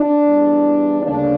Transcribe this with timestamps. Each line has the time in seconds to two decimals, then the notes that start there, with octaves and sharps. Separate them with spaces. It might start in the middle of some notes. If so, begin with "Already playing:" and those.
Already playing: D4
0.23 E2 E3 G3
1.02 D2 C#3 G3 A#3 C#4 D4